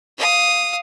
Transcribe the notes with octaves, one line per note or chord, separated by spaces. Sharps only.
F5 D#6